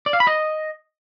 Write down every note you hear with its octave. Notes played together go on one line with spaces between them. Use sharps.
D5
F5
B5
D#5